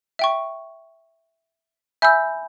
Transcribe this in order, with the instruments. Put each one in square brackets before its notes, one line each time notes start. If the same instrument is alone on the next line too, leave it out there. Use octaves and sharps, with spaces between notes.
[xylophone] E5 G5 C#6
[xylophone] E5 E6 [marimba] G#5 B5 G6